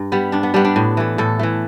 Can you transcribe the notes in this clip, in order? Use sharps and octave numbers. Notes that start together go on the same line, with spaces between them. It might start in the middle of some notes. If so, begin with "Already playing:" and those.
Already playing: G2
G3 B3
G2 D4
B3
G3 B3 D4
D4
A2
E3 A3
A2 A4
E3 A3